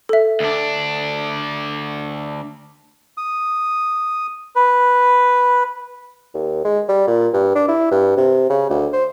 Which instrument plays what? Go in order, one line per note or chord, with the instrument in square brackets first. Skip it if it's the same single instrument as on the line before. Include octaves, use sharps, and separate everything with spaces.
[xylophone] A4 E5
[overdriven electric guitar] D2 D4
[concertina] D#6
B4
[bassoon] D#2
G#3
G3
A#2
G2
D4
E4
G2
C3
C#3
D2
C5